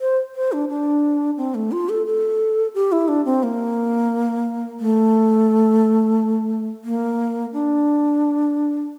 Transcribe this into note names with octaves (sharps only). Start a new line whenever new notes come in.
C5
C5
D4
D4
C4
A3
F4
A4
A4
G4
E4
D4
C4
A#3
A3
A#3
D4